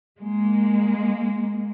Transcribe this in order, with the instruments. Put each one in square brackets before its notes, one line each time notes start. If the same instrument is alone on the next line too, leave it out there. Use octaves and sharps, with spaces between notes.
[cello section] G#3 A#3